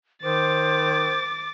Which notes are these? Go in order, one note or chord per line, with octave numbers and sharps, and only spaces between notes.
D#3 C5 D6 A6